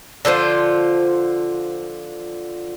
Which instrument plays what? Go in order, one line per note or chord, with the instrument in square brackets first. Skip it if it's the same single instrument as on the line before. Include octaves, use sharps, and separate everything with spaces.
[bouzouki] D3 F3 F4 C5